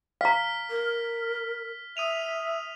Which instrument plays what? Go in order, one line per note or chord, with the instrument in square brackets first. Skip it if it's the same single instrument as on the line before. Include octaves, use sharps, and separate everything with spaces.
[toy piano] F5 A#5 [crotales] F6 B6
[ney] A#4
[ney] E5 [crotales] D#6 D#7 F7